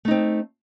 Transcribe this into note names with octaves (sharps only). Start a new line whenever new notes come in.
A3 C4 D#4